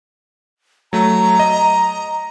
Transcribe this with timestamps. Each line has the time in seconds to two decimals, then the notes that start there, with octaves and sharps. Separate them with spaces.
0.93 F#3 A3 A#5
1.39 D#5